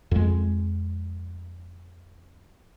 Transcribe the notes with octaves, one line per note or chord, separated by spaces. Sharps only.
F2 G#3